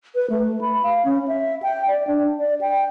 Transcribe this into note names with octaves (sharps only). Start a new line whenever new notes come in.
B4
A3
B5
F5
C#4
E5
G5
D5
D4
D5
G5